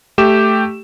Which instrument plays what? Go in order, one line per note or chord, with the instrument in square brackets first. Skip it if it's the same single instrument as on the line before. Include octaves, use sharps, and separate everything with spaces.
[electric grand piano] A3 G4 E7